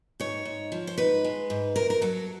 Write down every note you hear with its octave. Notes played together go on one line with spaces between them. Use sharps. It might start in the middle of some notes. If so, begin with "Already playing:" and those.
G#2 C#5
G#2
F3
C5
G#2 B4
G#3
G#2
F#2 A#4
A#4
F#3 A4